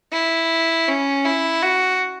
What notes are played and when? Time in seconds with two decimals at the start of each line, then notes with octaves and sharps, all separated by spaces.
0.12 E4
0.88 C#4
1.25 E4
1.62 F#4